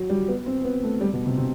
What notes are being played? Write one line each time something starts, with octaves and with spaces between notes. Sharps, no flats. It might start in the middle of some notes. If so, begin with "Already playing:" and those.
Already playing: F#3
G3
B3
C4
B3
A3
G3
B2
C3
C3